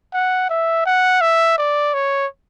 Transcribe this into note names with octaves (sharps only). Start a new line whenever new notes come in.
F#5
E5
F#5
E5
D5
C#5